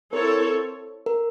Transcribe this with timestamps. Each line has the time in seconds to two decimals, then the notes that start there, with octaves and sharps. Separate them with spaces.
0.12 C4 E4 A4 A#4 C#5
1.06 A#4